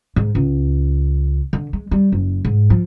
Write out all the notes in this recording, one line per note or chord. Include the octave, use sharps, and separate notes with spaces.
G#2
C#2
D3
G#3
G3
F#1
G#2
F3